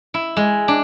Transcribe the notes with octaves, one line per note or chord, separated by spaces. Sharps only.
E4
G#3
D4